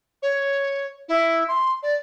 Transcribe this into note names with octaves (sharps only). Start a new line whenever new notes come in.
C#5
E4
C6
D5